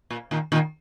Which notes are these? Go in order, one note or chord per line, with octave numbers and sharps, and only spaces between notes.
A#2
A#2 D#3
A#2 D#3